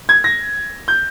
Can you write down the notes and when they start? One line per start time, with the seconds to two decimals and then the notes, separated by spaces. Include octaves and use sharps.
0.09 G#6
0.24 A#6
0.88 G6